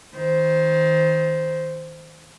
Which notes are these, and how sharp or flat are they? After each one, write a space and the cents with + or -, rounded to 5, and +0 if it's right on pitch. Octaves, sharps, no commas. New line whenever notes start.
D#3 +30 C5 +0